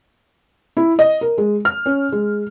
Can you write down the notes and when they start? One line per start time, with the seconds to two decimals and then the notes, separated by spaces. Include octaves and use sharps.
0.77 E4
0.99 D#5
1.21 A#4
1.38 G#3
1.65 F6
1.86 C#4
2.12 G#3